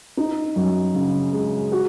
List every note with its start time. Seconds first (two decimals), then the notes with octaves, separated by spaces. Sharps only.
0.17 D#4
0.56 F#2
0.94 C#3
1.33 G#3
1.72 F#4